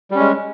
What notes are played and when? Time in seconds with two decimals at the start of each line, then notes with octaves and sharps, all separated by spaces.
0.11 G3
0.15 C#4
0.20 G#3